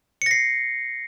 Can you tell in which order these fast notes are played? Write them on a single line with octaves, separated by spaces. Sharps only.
C#7 A#6 C7